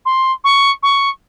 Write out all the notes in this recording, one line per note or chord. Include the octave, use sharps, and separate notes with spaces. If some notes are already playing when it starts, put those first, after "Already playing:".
C6
C#6
C#6